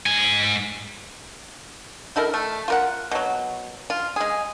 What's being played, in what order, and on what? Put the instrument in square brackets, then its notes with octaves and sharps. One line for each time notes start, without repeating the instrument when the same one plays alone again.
[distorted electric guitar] G#2 G#5
[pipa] D#4 E4 A4 A#4
A3
F4 A#4 F#5
B2 F#3
F4
G#3 G#4